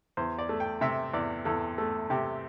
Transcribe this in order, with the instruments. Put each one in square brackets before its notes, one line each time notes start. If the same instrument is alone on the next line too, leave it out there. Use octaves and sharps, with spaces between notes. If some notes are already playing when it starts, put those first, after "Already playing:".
[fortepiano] E2 C5
D5
A3
G5
C3 E5
E2 D5
E2 A4
A3
C3 G4